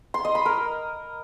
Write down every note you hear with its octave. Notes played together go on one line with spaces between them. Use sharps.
C6
D#5
B5
A#4